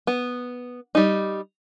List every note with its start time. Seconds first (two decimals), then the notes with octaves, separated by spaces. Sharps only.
0.07 B3
0.95 G3 D#4